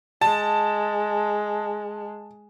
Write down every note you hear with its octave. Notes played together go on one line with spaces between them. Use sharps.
G#3 A5